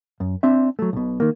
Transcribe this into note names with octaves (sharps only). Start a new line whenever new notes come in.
F#2
C4 D4 E5
F#3 A3
B1 B2
D#3 A#3